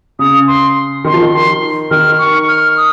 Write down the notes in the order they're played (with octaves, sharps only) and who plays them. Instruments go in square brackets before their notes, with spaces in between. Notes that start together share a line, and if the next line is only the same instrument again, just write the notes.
[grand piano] C#3 [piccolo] D#6
[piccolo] C6
[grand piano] D#3 [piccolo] C6
[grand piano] F3
D#3
[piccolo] C6
[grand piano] D#3 [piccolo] F6
[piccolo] C#6
F6
D#6